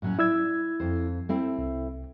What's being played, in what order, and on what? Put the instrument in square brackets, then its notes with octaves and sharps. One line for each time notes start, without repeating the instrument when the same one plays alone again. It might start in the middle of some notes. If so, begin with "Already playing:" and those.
[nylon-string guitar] A2 F#3 C#4
[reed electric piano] E4 E6 G#6 [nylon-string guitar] D5
[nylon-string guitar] F2 C5
A3 C4 E4
[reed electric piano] C2